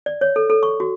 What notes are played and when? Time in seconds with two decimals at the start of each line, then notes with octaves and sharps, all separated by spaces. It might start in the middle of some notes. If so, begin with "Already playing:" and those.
0.06 D5
0.21 C#5
0.36 A4
0.50 A4
0.63 C#6
0.80 F#4